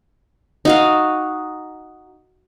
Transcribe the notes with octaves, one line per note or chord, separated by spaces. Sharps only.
D#4 F#4 F5